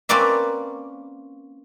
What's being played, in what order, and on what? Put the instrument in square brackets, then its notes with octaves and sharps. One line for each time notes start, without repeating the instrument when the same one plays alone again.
[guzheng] A#3 C4 C#4 B4 D5 E5